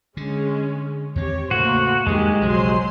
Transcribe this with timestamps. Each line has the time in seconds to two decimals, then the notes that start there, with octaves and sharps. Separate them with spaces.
0.17 D3 G#3 C#4
1.16 E2 D#3 C4 G4 C#5
1.51 A2 C#3 A3 A#3 F#4 C5
2.07 E2 G2 D#3 F#3 G#3 G4
2.41 B1 C#3 F3 F#3 C5 C6